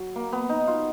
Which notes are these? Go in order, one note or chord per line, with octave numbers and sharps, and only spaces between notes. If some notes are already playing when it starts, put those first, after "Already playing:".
Already playing: F#3
A#3
B3
D#4
F4